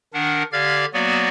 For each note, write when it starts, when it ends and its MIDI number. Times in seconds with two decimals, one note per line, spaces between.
0.14 0.43 51
0.14 0.43 62
0.14 0.43 70
0.14 0.43 78
0.52 0.85 50
0.52 0.85 67
0.52 0.85 74
0.52 0.85 77
0.52 0.85 89
0.52 0.85 92
0.94 1.29 54
0.94 1.29 58
0.94 1.29 59
0.94 1.29 66
0.94 1.29 74